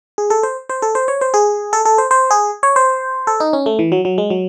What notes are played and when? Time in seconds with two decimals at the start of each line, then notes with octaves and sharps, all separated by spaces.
0.18 G#4
0.30 A4
0.43 C5
0.69 C5
0.82 A4
0.95 C5
1.08 C#5
1.21 C5
1.34 G#4
1.73 A4
1.85 A4
1.98 C5
2.11 C5
2.31 G#4
2.63 C#5
2.76 C5
3.27 A4
3.40 D#4
3.53 C#4
3.66 A3
3.79 E3
3.92 F#3
4.05 F#3
4.18 G#3
4.30 F#3